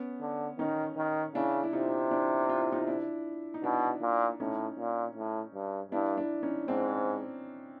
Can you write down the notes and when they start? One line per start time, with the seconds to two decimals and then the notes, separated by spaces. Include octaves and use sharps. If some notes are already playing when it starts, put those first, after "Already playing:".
Already playing: B3 C#4
0.21 D3
0.59 D#3 C#4 D#4
0.97 D#3
1.35 C#3 D4 E4
1.64 E4
1.73 C3 D#4 F4
2.11 D4 E4
2.49 F4
2.61 E4
2.72 D#4 F4
2.87 D4 E4
3.54 D#4
3.64 B2 D4 E4
4.02 A#2
4.40 A2 C#4 D#4
4.78 A#2
5.16 A2
5.54 G2
5.92 G2 D4 E4
6.17 D4 E4
6.43 C#4 D#4
6.68 G#2 C4 D4